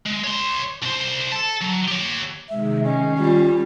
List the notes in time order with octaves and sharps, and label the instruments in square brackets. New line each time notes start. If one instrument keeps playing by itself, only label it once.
[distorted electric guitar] G#3
C#5 C6
C2 C5
A4 A5
F#3
G4 C#5
[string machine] C3 D#3 G#3 [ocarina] E5
[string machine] D#3 C7 [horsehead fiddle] C#4 [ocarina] D#5
[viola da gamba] G3 [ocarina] F4